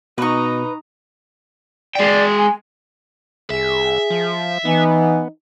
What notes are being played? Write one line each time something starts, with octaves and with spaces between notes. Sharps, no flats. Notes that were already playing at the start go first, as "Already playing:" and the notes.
B2 D#4 B4 A#5 C#6
G#3 D5 G5
G#5
C2 G#4 E5
F3
E3 B3 D#4